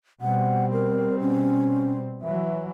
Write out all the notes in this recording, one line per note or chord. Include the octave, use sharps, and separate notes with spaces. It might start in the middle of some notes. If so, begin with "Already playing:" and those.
B2 G3 C4 F#5
A#4
C#4
E3 F#3 E5